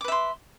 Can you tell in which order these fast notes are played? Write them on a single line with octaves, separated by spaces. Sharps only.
D6 B4 E5 C6